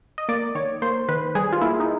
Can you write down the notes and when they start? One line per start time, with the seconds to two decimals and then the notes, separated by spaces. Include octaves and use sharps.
0.18 D#5
0.29 A#3 D5
0.55 D#3 C#5
0.82 A#3 C5
1.09 D#3 B4
1.35 G3 G#4
1.53 F4
1.61 A#3 E4
1.80 D#4